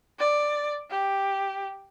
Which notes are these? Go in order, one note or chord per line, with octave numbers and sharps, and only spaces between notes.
D5
G4